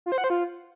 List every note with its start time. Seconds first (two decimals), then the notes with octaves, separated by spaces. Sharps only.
0.06 F4
0.12 C5
0.18 F#5
0.24 C5
0.30 F4